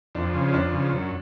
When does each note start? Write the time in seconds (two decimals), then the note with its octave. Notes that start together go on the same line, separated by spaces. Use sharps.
0.15 F2 D4
0.34 C#3 F3
0.49 C#4
0.53 F2 D4
0.72 C#3 F3
0.92 F#2